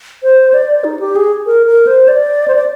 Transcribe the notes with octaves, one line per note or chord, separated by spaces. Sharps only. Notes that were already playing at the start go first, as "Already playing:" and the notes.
C5
D5
D#4
G4
G#4
A#4
A#4
C5
D5
C5
D5